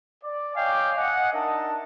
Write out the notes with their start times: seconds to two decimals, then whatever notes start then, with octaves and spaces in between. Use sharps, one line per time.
0.23 D5
0.55 C#5 D#5 F5 G5 G#5 D6
0.97 D#5 F#5 G#5
1.33 D4 D#4 A#4 D#5 E5 A5